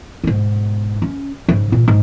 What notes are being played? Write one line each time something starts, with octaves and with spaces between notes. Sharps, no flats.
G#2 B2
C#4
G#2 C#3
A#2 E3
G#2